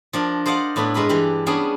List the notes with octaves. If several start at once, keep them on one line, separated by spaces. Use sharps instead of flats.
F3 D4 A#4
C5 D5 D#5 F5 F#5
A2 B3 D4 E4 B5
G2 G#3 A#4 B4 B5
E3 D4 G4 B4
G3 B3 C#4 D4 G#4